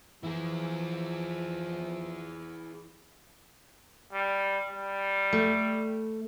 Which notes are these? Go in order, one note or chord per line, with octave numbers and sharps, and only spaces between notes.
E3 F3 E4 G#4
G3
G3
A3